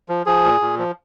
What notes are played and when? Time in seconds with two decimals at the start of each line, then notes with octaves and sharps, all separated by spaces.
0.09 F3
0.26 F3 G#4
0.44 A#2
0.61 A#2
0.79 F3